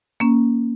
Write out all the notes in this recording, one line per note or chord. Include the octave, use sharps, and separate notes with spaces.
A#3 C#4